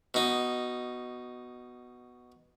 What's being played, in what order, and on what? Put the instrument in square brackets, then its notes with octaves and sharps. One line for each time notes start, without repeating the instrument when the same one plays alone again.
[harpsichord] B2 D#4